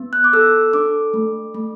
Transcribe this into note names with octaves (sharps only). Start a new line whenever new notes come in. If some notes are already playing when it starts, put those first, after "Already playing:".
Already playing: B3
F#6
D6
A4 E6
D4 D6
A3
A3